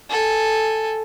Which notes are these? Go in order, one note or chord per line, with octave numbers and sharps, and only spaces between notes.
A4 G#5